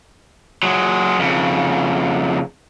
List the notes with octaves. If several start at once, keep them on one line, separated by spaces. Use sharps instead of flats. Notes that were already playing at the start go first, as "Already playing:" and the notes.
F#3 G#3
F2 C#3